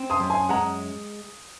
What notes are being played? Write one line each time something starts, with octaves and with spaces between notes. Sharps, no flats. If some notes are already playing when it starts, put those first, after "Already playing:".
Already playing: C4
C6 D#6
F#2
G#5 C6
G#3 F#5 A#5